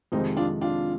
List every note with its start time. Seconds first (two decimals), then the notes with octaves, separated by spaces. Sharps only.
0.12 F2 C3 D#3 G#3 C4 D#4
0.37 D4 F4
0.61 D4 F4